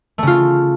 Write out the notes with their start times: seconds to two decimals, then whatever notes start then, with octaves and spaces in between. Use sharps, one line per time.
0.18 A3
0.23 C#3
0.27 F4